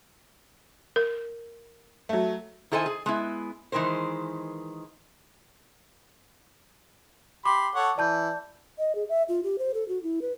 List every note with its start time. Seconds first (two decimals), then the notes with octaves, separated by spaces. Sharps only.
0.96 A#4
2.09 F#3 A3
2.72 D#3 E4 A4 C5 D#5 G#5
2.86 G#4
3.06 G#3 B3 E4
3.72 D#3 E3 G#3 A#4 C5
7.46 G4 B5 C6 D6
7.75 A4 C#5 F#5
7.98 E3 D5 A5 G6
8.78 D#5
8.95 G#4
9.09 E5
9.29 F4
9.44 G4
9.59 C5
9.74 A4
9.88 F#4
10.03 E4
10.22 B4